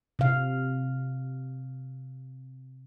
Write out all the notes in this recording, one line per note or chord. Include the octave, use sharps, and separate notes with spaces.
C3 F5